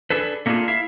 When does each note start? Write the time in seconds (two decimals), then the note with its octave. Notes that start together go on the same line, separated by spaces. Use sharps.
0.10 D4 G#4 A4 B4
0.46 A3 A#3 C#4 D4 F4 G#4
0.68 E4 E5 F5